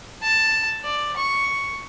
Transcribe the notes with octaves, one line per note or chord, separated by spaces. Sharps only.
A5
D5
C#6